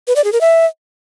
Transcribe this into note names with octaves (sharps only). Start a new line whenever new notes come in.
B4
D5
G#4
A#4
E5